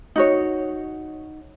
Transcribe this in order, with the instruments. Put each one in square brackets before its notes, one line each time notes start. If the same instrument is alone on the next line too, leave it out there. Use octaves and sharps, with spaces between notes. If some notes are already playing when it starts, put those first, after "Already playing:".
[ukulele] D#4 F#4 C#5